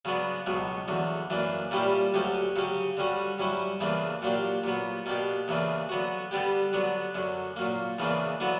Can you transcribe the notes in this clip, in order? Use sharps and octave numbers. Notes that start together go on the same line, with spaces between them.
C#3 F#3 B3 D4
C#2 B2 F#3
E2 D3 F#3
F#2 E3 A#3 D4
A#2 G3 C#4 E4 G4
D2 D3 F#3 C#4 G4
C#3 F#3 C#4 G4
D3 G3 C#4 F#4
G2 F#3 C#4 E4
E2 C#3 E3 A#3 D4
A#2 F#3 A#3 D4 G4
A#2 F#3 B3
B2 A#3 D4 G4
E2 C#3 E3 A#3 D4
D3 F#3 B3 F#4
D3 G3 B3 D4 G4
D3 F#3 B3 D4
F#2 D3 F#3
A#2 F#3 A#3
E2 C#3 E3 A#3 D4
D3 F#3 B3 E4